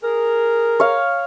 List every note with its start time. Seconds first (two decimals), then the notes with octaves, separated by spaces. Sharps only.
0.02 G#4 A#4
0.80 C#5 F5